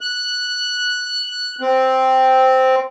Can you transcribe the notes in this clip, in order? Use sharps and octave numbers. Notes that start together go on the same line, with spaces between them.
F#6
C4